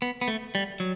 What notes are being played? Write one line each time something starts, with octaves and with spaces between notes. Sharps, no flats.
B3
B3
A3
G3
F#3